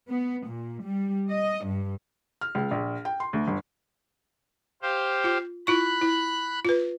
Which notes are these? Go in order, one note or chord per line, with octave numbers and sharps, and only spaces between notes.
B3
A#2
G3
D#5
G2
F6
C#2
A#1
G5
C6
D2
G1
G4 C5 F5
F4
E4 F4 B5 C#6 F#6
E4
F4 B4